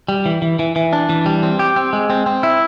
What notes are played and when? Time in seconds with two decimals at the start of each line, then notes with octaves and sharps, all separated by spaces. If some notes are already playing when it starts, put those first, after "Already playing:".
0.09 G3
0.26 E3
0.42 E3
0.59 E3
0.76 E3
0.93 D4
1.09 E3
1.26 G3
1.43 C4
1.59 G4
1.76 C4
1.93 G#3
2.10 C4
2.26 C4
2.43 E4